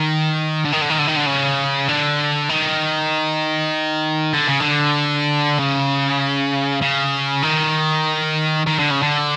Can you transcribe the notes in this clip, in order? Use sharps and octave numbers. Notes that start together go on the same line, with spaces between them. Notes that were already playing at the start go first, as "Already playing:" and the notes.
Already playing: D#3
D3
D#3
D3
D#3
D3
D#3
D3
C#3
D3
D#3
D3
C#3
D3
C#3
C#3
D#3
D#3
D3
C#3
D3